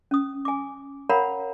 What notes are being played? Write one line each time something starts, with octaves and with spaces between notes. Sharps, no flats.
C#4 D#6
G#5 D6
A#4 C#5 F5 F#5 A#5 B5